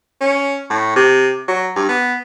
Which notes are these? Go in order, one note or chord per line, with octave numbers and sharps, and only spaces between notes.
C#4
A2
C3
F#3
G2
B3